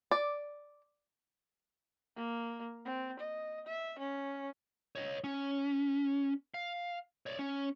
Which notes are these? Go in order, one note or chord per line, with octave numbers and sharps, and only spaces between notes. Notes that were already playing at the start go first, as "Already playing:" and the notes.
D5
A#3
C4
D#5
E5
C#4
C#5 D#5
C#4
F5
C#5 D5
C#4